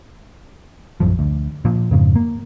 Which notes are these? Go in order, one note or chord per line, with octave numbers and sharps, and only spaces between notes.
A#1 F#2 F3
D2
A#2 F3
F2 G#2 C#3
A#3